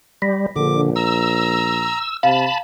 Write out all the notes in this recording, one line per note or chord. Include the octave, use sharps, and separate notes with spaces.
G3 B5 A#6 B6
A#1 D3 D6
A#5 E6
C3 F5 A5 B5